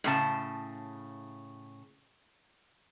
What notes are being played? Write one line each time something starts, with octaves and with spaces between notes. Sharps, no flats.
A2 C#3 A5